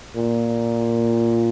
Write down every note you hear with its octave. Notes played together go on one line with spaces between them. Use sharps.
A#2